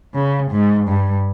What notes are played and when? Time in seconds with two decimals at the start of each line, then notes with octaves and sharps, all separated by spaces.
0.14 C#3
0.51 G#2
0.88 G2